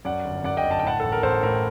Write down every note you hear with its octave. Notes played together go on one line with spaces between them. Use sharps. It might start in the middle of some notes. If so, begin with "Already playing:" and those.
F#2 D5 F#5
G1
F#2 D5 F#5
D#5 G5
G1
A5
G5
A2 F#5 A5
A1 A4
A#4
A1 A4 C5
A2 A#4